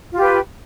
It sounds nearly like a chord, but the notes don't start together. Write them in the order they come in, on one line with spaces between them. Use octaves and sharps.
F4 G4 B4